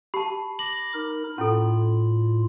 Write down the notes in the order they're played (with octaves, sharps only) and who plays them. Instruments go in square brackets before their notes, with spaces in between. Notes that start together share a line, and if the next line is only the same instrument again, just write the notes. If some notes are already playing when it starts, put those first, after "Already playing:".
[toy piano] G4 A5 [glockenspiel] B5
[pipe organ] D6 A#6 [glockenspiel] F#7
[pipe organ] D#4 A#4
[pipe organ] A2 F4 [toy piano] C#4 E4 A4